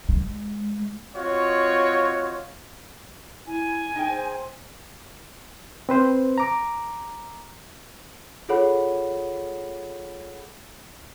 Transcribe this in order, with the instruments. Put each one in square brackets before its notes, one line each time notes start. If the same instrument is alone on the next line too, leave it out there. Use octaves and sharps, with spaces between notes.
[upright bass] G#3
[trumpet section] C4 F4 F#4 C#5 D#5
[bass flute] E4 [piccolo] G#5
[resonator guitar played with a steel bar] D#4 G#4 G5
[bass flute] C5
[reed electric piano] C4 B4 C5
A#5 D6
[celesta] F4 G#4 A4 C#5 F#5 B5